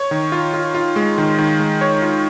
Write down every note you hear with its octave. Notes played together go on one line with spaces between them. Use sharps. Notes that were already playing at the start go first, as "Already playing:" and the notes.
Already playing: C#5
D#3
F4
F4
F4
G#3
D#3
D#3
G#3
C#5
F4